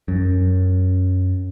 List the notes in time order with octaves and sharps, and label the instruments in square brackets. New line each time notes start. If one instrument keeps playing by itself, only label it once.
[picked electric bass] F#2